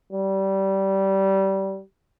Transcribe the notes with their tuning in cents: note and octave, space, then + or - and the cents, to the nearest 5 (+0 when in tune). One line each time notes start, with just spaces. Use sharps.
G3 -20